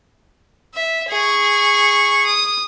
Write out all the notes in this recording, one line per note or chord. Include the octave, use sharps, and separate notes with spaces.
E5
G#4 C#6
D#6